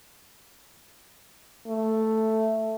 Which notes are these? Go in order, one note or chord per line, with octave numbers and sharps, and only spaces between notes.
A3